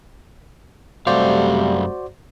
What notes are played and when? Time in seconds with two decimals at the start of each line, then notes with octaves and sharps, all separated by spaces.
1.07 F#2 C3 G3 A3 F#4 C5 D5 F5